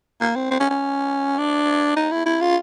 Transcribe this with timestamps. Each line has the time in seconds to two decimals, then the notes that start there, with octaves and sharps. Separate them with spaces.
0.21 A#3
0.36 C4
0.50 C4
0.60 C#4
0.70 C#4
1.38 D4
1.96 D#4
2.11 E4
2.25 E4
2.41 F4